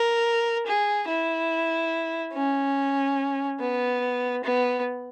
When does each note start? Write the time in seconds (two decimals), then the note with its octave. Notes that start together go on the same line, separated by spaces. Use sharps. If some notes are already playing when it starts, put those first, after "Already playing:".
Already playing: A#4
0.67 G#4
1.08 E4
2.34 C#4
3.60 B3
4.44 B3